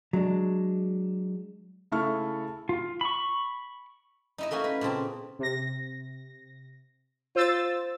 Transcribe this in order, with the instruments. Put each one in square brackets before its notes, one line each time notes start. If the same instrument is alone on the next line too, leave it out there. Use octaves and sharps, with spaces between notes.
[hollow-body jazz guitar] F#3 G#3 D4
[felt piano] C#3 A3 E4 A4 C#6 F6
[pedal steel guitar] F4
B5 C#6
[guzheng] D#4 E4 D#5
A3 A#3 C#4 F#4
B4
A#2 C#3 C4 A5
[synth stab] C3 A#6
[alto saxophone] F4 [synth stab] C5 E6 A6